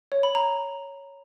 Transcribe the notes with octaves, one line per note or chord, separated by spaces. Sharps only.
C#5
B5
A#5